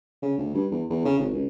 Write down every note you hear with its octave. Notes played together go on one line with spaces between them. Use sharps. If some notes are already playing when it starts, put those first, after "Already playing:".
C#3
D2
G2
E2
E2
C#3
G#1
C#2